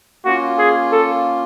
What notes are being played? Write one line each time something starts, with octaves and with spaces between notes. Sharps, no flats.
A#3 C#4 F4 F#4
G#4
A4